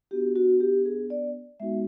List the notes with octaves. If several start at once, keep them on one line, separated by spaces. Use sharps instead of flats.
B3 D4 F#4 G4
F#4
G4
G#4
D5
G#3 B3 D#4 F#4 E5